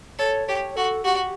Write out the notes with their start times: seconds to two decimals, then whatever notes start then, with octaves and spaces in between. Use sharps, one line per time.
0.19 A4 C#5
0.48 G4 C#5
0.76 F#4 A4
1.04 F#4 G4